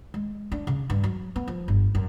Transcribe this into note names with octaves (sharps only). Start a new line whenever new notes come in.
G#3
D4
C#3
G2
F#3
B3
F3
G1
F#2